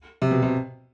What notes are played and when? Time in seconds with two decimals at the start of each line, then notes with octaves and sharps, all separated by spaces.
0.22 C3
0.31 B2
0.43 C3